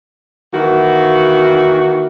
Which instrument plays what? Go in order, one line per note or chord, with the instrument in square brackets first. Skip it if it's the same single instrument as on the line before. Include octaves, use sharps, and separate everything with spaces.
[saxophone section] D#3 E3 A#3 F#4